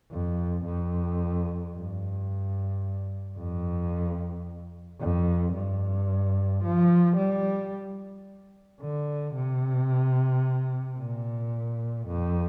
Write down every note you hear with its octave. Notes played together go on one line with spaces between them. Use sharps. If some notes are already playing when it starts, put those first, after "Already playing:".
F2
F2
G2
F2
F2
G2
F3
G3
D3
C3
A#2
F2